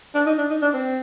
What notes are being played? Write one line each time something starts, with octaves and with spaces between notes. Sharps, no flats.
D4
D#4
D4
D#4
D4
C4